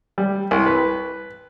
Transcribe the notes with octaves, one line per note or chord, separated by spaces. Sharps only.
G3
C2
B4